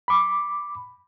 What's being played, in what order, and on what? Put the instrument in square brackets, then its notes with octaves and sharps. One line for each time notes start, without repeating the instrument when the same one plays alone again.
[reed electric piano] B5 D6